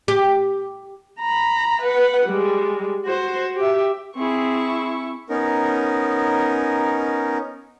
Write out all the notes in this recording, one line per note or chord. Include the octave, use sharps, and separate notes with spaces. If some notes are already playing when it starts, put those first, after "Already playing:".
G4
A#5 B5
B4 F#5
G3 G#3
F#4 C5
G4 E5
C4 E4 G#4 C#6
B3 C#4 D#4 A#4